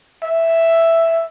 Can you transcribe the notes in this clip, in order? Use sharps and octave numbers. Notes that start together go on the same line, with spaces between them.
E5